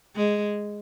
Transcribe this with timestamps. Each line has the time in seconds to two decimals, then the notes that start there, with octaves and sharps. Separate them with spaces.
0.16 G#3